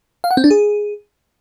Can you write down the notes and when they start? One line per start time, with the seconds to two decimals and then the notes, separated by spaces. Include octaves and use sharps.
0.24 F5
0.31 F#5
0.37 C4
0.44 D4
0.51 G#4